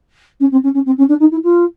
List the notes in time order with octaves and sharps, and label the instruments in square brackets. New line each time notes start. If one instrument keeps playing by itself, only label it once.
[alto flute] C#4
C4
C#4
C#4
C4
C#4
D4
D#4
E4
F4